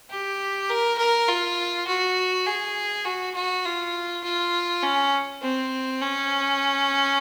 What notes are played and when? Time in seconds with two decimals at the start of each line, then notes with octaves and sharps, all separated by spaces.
0.10 G4
0.69 A#4
0.98 A#4
1.28 F4
1.87 F#4
2.46 G#4
3.05 F#4
3.34 F#4
3.65 F4
4.24 F4
4.83 C#4
5.42 C4
6.01 C#4